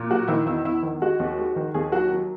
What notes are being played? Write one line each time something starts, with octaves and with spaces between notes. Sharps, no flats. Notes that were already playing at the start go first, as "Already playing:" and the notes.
Already playing: A#2
F#3 F#4
D#3 E4
E2 E4
E2 E4
D#3
G#3 F#4
D#2
G#3
D#3
D#2 G#4
F#3 F#4
F#3